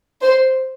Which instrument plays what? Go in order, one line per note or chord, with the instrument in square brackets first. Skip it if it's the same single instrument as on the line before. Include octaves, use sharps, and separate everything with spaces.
[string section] C5